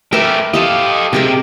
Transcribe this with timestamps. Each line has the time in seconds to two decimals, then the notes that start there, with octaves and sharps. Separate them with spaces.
0.13 A3 G4 A#4 B4 E5
0.54 G4 A4 D#5 F5 A5
1.13 C3 G#3 G4 A#4